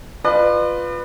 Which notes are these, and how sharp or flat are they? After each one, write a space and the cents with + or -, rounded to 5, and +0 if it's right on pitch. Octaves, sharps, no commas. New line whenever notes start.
F4 +0 B4 +5 D5 +45